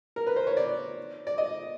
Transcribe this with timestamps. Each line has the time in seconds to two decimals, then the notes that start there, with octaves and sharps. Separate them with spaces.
0.16 A#4
0.27 B4
0.36 C5
0.47 C#5
0.57 D5
1.27 D5
1.38 D#5